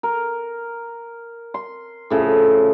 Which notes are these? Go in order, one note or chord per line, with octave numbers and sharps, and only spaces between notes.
A#4
C6
A2 C#3 F3